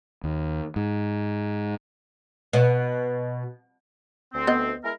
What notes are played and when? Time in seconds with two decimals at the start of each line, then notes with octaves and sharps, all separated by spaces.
0.24 D#2
0.76 G#2
2.53 B2
4.34 D2 C4
4.47 B3 D#5
4.84 G#3 E4 A#4